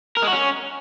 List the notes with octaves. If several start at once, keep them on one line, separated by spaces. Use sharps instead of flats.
A#4
G#3
F#4
C#4